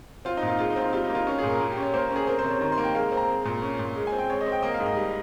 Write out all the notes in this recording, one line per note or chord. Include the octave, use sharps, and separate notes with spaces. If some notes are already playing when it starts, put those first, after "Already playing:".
C4 F4
D#4
A#2
F4
G#3 F4
D#4
C4
F4
G3 F4
D#4
A#3
F4
C#4 F4
A#2 G#4
A#4
A#3 F4
G4
C#4
C#5
A#3 C5
C#4
G#4
C4 A#4
C5
C3
C#5
D#3 A#5
C6
A#3
G5
G#3 F5
C4
A#5
G#3
A#2
C#4
A#2
G#3
G#5
C4
G5
G#3 C#5
D#5
C4
G5
A#3 D#5
F5
G#2
D#5
G3